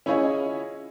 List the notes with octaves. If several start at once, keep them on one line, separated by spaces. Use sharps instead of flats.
C#4 E4 F4 G#4 C#5 D#5